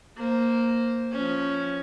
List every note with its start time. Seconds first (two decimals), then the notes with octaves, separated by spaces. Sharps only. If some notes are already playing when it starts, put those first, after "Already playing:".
0.18 A#3 C5
1.12 F3 C#4